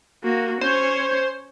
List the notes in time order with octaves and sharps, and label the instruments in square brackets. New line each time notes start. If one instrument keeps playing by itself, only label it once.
[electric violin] A#3 F#4
[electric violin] C#4 C#5 [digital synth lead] C5